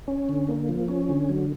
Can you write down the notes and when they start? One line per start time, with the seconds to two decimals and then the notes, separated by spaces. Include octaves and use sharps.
0.08 C#4
0.29 D3
0.48 A#3
0.69 F3
0.88 C#4
1.09 D3
1.29 F#3